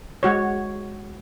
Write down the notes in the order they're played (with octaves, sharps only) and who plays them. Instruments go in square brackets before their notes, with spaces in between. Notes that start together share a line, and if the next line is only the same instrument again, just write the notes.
[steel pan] G#3 F#4 C#5